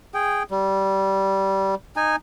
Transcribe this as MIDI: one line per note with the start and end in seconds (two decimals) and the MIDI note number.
0.14 0.43 68
0.14 0.43 79
0.51 1.75 55
1.96 2.16 63
1.96 2.16 80